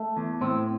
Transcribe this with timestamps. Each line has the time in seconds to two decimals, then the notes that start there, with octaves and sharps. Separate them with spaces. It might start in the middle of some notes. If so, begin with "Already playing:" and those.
Already playing: A3
0.17 E2
0.41 A2 C4